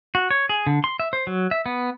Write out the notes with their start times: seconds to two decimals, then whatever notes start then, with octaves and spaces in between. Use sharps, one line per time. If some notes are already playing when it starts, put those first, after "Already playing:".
0.15 F#4
0.31 C#5
0.49 G#4
0.67 D3
0.84 C6
1.00 E5
1.13 C5
1.27 F#3
1.51 E5
1.66 B3